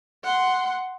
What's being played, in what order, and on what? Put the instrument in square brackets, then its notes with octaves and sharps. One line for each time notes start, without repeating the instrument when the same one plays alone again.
[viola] F#5 C6